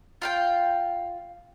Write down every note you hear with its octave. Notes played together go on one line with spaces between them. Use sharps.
F4 F5 G5